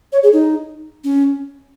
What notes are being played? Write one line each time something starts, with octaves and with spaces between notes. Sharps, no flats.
C#5
G#4
D#4
C#4